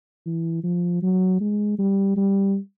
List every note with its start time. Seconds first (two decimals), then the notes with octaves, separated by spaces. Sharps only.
0.26 E3
0.63 F3
1.03 F#3
1.41 G#3
1.79 G3
2.16 G3